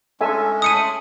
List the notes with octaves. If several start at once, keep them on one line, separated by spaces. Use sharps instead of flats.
G#3 C#4 A4 E5 G#5
A3 E4 D#6 C#7 D#7